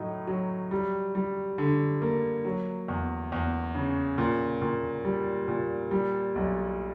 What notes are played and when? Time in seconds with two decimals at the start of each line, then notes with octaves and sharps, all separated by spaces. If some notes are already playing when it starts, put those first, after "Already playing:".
Already playing: A2 F#3 D#4
0.27 F#3
0.71 G3
1.15 G3
1.58 D3
2.02 A#3
2.45 F#3
2.88 E2
3.32 E2
3.75 C#3
4.18 A#2
4.61 A#2
5.05 G3
5.48 A#2
5.91 G3
6.35 B1